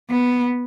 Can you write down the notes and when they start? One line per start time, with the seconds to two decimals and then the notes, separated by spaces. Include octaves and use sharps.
0.10 B3